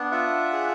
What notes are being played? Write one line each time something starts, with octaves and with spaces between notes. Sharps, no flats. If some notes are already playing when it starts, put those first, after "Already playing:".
Already playing: B3 D4
F4 E5 F#5
G#4